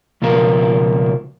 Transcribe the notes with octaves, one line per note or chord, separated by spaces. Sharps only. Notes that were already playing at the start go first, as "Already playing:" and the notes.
C#2 B2 F3 A#4